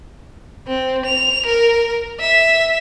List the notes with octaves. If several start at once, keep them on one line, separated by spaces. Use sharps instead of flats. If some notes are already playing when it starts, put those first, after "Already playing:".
C4
F7
A#4
E5